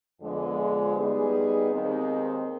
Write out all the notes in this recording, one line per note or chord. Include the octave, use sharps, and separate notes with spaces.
F2 D3 F3 G#3 B3
G3 B3 D#4 G#4
D#2 D#3 G#3 C4